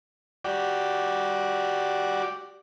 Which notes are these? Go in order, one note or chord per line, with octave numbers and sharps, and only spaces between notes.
F#4 G4 D5